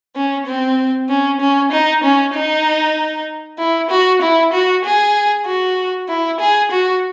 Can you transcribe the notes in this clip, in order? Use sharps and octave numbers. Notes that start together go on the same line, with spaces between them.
C#4
C4
C#4
C#4
D#4
C#4
D#4
E4
F#4
E4
F#4
G#4
F#4
E4
G#4
F#4